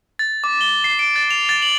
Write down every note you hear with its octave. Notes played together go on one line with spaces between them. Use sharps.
A6
D6
G7
C7
D7
A6
F7
A6
F#7